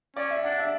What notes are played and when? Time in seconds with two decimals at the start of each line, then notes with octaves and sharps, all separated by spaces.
0.16 C#4 D5
0.31 E5
0.44 D4 F#5
0.59 E5